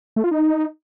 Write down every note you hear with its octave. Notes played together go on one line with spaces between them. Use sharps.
A3
F4
D#4